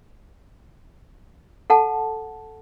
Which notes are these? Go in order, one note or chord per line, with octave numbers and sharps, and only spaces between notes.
A4 F#5 A5